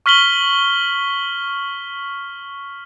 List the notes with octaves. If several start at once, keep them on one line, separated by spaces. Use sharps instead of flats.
C#6 F6 B6 F#7 G7